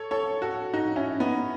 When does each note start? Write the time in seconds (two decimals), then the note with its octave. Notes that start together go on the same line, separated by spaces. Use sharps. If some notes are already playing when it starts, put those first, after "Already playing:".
Already playing: A4 C#5
0.11 A4 C#5
0.42 F#4 A4
0.74 D#4 F#4
0.96 C#4 E4
1.20 B3 D#4